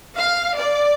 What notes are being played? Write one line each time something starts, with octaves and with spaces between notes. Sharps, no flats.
F5
D5